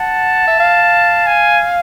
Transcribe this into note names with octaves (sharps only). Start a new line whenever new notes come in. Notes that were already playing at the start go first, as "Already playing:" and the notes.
Already playing: F#5 A5
E5
F5
G#5